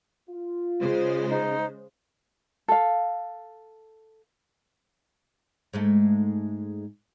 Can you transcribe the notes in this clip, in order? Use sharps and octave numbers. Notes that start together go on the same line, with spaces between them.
F4
C#3 G#3 C5
D#4
A4 F5
G#2 G#3 A3